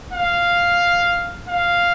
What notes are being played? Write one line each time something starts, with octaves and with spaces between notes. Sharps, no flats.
F5
F5